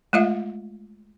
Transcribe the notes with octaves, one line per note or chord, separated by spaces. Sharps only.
G#3 A3 F4 D#5 E5